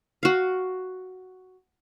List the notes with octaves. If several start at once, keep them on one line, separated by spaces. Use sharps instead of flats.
F#4 F5